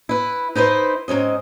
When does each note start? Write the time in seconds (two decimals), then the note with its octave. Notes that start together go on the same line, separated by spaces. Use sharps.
0.09 E4 B4
0.55 D#4 E4 B4 C5
1.08 G#2 C4 C#4 D#5